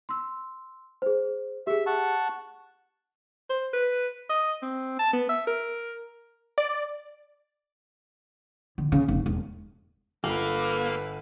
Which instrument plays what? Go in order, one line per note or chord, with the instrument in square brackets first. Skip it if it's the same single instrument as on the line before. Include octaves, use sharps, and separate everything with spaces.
[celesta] C6 E6
G#4 C5
[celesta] G4 G#4 [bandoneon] E5
[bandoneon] F#5 A5 C#6
[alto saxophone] C5
B4
D#5
C4
A5
B3
E5
A#4
[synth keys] D5
[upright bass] D3
C#3
F1
E1
[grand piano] G1 [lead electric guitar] A#3 [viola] A4 B4